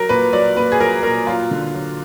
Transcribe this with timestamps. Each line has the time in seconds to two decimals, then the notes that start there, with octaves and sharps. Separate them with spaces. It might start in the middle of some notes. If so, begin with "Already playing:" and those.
Already playing: F#3 A#4
0.09 A#2 B4
0.33 F#3 D5
0.56 A#2 B4
0.72 G#4
0.80 F#3 A#4
1.03 A#2 A#4
1.27 F#3 F4
1.51 D3
1.74 F#3